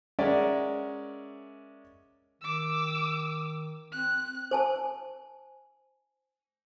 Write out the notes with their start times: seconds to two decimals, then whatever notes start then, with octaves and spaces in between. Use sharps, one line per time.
0.19 G#3 C#4 A#4 D5 E5 F#5
2.42 D#3 D6 E6
3.92 C4 F#6
4.51 C5 G#5 A5